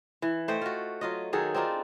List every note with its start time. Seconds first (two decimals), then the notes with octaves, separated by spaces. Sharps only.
0.22 E3
0.48 A3 C5 D#5 G5
0.61 F4 F#4
1.01 F#3 F4 D#5
1.33 D#3 F#3 G#4 A4
1.55 C4 D4 D#4 F4